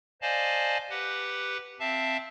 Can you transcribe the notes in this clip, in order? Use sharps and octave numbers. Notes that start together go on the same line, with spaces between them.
C5 D5 D#5 F5 G#5 A5
G4 B4 F#5
C4 E5 F5 A5